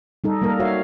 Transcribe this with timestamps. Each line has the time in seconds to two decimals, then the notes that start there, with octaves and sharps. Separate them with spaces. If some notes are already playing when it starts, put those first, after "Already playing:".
0.24 G3 D#4 A4
0.41 G3 A#3 A4 A#4
0.59 F#4 C#5 E5 F5